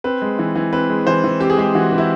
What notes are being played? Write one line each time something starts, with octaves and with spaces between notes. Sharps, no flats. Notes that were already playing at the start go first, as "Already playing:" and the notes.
C4 B4
G#3
E3
E3
C4 B4
G#3
E3 C5
E3
C4 G4
G#4
G#3 G4
E3 F#4
E3
E4